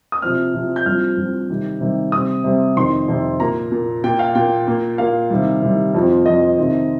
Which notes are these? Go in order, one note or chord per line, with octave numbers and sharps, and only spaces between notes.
D#6
C3 F3 C4 F6
C3 F3 C4
G6
G2 F3 C4 F6
G2 F3 C4
C3 D#3 G3
C3 D#3 G3
C3 G3 C4 D#6
C3 G3 C4
F2 C3 D#3 C4 C6
F2 C3 D#3 C4
A#2 A#3 A#5
A#2 A#3
A#2 A#3 G5
F5
A#2 A#3 G5
A#2 A#3
A#2 A#3 F5
C3 D#3 G3
C3 D#3 G3
F2 F3 C4
F2 F3 C4 D#5
C3 D#3 C4